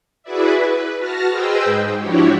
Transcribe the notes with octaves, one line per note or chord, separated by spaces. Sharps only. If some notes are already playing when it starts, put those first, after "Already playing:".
E4 F#4 G#4 B4 D5 E5
B4
F#4 A5 F6 A#6
G#4 B4 C5 D#5 G5 E6
G#2
F3 D4 E4 F#4 G4 C#5